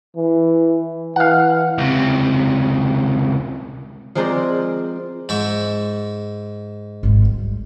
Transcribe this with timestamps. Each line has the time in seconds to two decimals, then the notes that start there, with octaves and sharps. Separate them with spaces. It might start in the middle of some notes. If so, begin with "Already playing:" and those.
0.16 E3
1.16 E3 F5 F#5
1.78 C#2 C3
4.15 F3 G#3 C4 A#4 C5 D5
5.29 G#2 E5 C#6
7.03 G#1 D2
7.22 G3